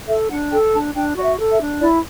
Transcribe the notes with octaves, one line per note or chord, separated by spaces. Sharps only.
A4 E5
D4 F#5
A4 G5
D4 A5
D4 G5
F#4 D5
E5
A4
E5
D4
E4 D5